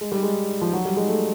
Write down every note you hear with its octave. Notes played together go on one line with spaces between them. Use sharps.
G#3
G3
G#3
F3
F#3
G3
G#3
A3